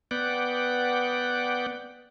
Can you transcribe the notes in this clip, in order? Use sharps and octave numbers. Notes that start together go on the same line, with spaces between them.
B3 D5 F#5 G5